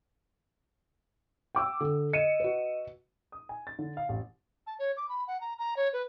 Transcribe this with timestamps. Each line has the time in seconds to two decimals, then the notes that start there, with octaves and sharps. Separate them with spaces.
1.55 G5 D6 E6
1.81 D3 A4
2.13 D#5 C#7 D#7 E7
2.40 F#4 B4
3.32 D#6
3.49 G#5
3.67 A6
3.79 D3
3.97 F5
4.09 A1
4.67 A5
4.79 C#5
4.97 D6
5.09 B5
5.28 F#5
5.41 A#5
5.59 A#5
5.77 C#5
5.93 B4